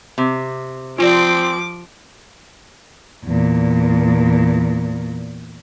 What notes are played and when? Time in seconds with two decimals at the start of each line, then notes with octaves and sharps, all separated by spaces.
0.18 C3
0.99 F3 C4 F4 D5 D6
3.25 E2 A#2